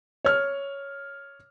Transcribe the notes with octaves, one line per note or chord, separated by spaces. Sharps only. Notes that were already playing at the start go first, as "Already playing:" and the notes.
C#5 F6